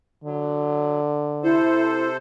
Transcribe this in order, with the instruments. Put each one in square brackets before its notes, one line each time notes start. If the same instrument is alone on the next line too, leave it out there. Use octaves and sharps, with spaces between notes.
[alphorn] D3 [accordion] F#3
[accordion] C3 A4 C5 [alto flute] E4